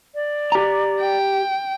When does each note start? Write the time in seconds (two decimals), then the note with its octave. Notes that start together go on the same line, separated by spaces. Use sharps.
0.15 D5
0.52 G4 A#5
1.01 G5